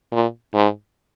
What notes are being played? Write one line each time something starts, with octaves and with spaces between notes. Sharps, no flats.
A#2
G#2